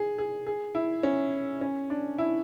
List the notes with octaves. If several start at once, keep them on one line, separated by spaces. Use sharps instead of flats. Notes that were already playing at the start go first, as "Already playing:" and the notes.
Already playing: G#4
G#4
G#4
E4
C#4
C#4
D4
E4